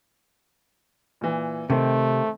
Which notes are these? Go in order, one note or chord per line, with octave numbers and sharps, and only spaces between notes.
A#2 E3
C3 D#3 A3 C4